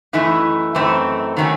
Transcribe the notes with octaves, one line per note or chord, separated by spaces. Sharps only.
F#2 E3 A3 D#4 E4
F#2 E3 A3 C4 D#4
D#3 F#3 A3 C#4